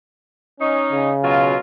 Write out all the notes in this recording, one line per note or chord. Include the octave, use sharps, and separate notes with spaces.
C#4 D#4
C#3
B2 F#3 F4